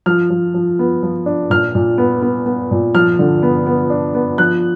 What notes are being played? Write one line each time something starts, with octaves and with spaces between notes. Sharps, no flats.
F3 F6
F3
F3
B3
F3
D4
A#2 F6
A#2
B3
B3
B3
A#2
F3 F6
D3
B3
B3
D4
B3
F3 F#6